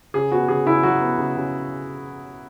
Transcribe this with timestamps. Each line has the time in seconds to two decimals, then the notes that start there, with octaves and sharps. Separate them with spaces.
0.14 C#3 G#4
0.31 B3 F#4
0.48 C#3 G#4
0.66 C#3 E4
0.83 F#3 F#4
1.01 B3
1.18 C#3
1.37 C#3